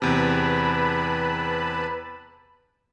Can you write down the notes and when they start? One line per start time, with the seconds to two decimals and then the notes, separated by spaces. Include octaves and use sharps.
0.02 E2 C3 B4 A5 B5